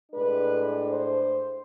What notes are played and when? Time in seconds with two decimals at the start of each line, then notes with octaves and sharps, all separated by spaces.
0.12 A2 G#3 D4 B4
0.86 C5